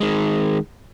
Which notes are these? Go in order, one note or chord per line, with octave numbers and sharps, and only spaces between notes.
D#3 G#3